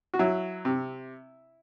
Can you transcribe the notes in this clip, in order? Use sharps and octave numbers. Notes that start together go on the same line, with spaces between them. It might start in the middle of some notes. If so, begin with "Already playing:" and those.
F#4
F#3 E4
C3